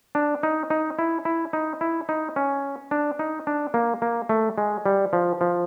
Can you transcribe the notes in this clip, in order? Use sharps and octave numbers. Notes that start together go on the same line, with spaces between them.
D4
D#4
D#4
E4
E4
D#4
E4
D#4
C#4
D4
D#4
D4
A#3
A#3
A3
G#3
G3
F3
F3